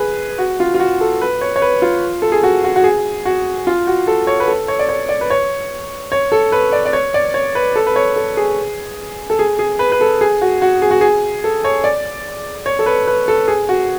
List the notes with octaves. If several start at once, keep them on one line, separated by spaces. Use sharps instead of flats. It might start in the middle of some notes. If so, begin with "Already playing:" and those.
Already playing: G#4 B4
F#4
F4
F4
F#4
A4
B4
C#5
C#5
B4
F4
A4
G#4
F#4
F#4
F#4
G#4
F#4
F4
F#4
A4
C#5
B4
A4
C#5
D5
C#5
D5
B4
C#5
C#5
A4
B4
D5
D5
C#5
D5
C#5
B4
A4
B4
C#5
A4
G#4
A4
G#4
G#4
B4
B4
A4
G#4
F#4
F#4
G#4
F#4
G#4
A4
C#5
D5
C#5
A4
B4
B4
A4
G#4
F#4